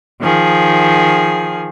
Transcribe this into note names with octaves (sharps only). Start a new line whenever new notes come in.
D#3 F3 G#4